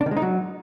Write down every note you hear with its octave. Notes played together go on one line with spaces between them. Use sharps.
D4
D#3
G#3
D#4
F#3